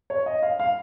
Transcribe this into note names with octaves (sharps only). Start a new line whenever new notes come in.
C#5
D#5
F5
F5